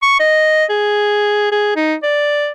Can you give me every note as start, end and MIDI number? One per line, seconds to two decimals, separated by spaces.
0.02 0.20 85
0.20 0.65 75
0.70 1.47 68
1.52 1.74 68
1.76 1.95 63
2.03 2.50 74